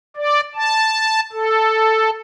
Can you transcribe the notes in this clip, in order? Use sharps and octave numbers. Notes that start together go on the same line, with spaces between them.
D5
A5
A4